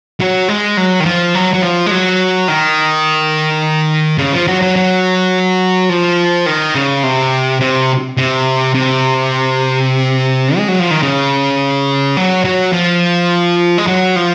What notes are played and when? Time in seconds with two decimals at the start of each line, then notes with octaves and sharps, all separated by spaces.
0.20 F#3
0.48 G#3
0.77 F#3
1.00 D#3
1.05 F3
1.35 F#3
1.54 F#3
1.62 F3
1.86 G#3
1.91 F#3
2.48 D#3
4.18 C#3
4.32 F3
4.47 F#3
4.62 F#3
4.76 F#3
5.89 F3
6.46 D#3
6.75 C#3
7.03 C3
7.61 C3
8.17 C3
8.75 C3
10.57 G#3
10.68 F#3
10.79 F3
10.91 D#3
11.03 C#3
12.17 F#3
12.45 F#3
12.73 F3
13.78 G#3
13.87 F#3
14.16 F3